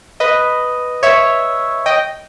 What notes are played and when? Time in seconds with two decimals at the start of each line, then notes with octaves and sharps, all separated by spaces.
0.20 B4 D#5
1.03 C#5 E5
1.86 D#5 G5